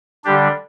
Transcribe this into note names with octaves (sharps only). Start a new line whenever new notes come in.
D3 G3 D4 G4